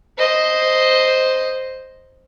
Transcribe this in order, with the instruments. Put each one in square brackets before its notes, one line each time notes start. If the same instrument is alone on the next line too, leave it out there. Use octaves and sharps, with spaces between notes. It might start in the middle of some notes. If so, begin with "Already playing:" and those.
[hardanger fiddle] C5 D#5